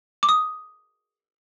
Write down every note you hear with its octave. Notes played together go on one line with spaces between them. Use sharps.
D6
D#6